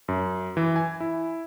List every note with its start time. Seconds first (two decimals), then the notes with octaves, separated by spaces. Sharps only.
0.08 F#2
0.57 E3
0.76 G#5
1.00 E4